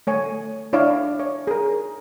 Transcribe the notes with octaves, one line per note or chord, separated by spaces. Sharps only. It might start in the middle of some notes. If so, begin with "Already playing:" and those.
A3 C#5 G#5
D4 E4 C#5 D5 F5
C#5
G#4 A#4